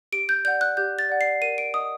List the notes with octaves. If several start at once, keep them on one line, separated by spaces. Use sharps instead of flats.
G4 D7
G6
D5 F#5 G6
F#6
G4 G6
A6
D5 F#5
C7
A#4 D#7
D7
D#5 F#5 D#6